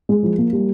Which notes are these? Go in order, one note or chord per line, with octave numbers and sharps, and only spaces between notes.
G#3
F3
A#3
G3